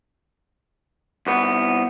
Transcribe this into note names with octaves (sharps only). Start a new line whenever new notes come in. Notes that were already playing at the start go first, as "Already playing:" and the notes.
C2 B3